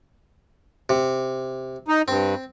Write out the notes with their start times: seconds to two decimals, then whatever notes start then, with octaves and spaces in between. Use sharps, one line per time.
0.89 C3
1.88 D#4
2.08 G2 C4